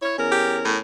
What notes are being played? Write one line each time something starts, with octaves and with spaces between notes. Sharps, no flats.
E4 C#5
E2 C#4 A#4
G4
A2